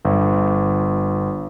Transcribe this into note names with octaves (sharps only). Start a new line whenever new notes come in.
G1